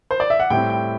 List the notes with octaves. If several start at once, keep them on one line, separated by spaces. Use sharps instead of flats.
C5
D5
E5
F#5
A2 G3 C4 E4 G5
G5